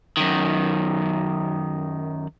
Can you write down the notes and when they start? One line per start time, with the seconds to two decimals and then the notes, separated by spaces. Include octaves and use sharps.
0.17 F#2 D#3